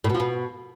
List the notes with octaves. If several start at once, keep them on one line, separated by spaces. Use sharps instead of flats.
A2
B2
F3
B2